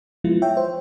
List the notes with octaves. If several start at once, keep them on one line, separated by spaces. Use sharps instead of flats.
F3 G#3 B3 E4 F4
C#5 E5 G5
C5